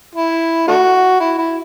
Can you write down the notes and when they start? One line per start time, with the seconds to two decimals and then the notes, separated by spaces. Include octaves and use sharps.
0.15 E4
0.68 A3 D4 F#4
1.20 E4
1.38 E4